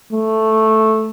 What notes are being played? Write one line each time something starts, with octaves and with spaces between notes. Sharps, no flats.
A3